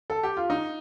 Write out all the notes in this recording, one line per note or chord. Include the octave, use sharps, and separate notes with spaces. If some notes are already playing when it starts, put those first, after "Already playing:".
A4
G4
F4
D#4